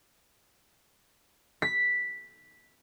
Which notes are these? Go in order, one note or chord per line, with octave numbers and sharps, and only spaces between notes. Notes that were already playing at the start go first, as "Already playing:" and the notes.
B6